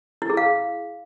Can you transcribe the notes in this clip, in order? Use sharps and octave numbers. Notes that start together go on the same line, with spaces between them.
E4
G#4
F5